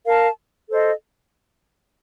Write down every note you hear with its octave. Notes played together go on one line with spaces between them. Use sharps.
A#4 F5 A5
A4 C5 D#5